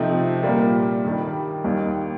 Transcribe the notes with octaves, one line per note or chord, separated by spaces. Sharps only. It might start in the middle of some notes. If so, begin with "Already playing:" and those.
Already playing: C3 F3 A3 C4 D#4
A#2 G3 A#3
G2 D#3 G3
D#2 D#3 G3